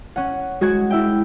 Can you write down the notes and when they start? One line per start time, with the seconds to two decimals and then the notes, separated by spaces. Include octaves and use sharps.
0.16 C#4 F#5
0.61 G#3 F#4 F#5 G#6
0.90 E4 E5 G5